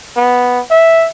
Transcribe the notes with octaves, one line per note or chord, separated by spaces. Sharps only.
B3
E5